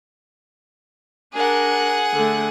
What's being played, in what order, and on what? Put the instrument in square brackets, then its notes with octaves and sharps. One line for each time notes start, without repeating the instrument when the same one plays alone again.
[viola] D4 A#4 [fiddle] G#4 F#5
[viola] D3 A3